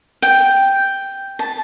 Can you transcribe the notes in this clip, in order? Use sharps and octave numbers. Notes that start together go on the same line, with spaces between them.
G5
A5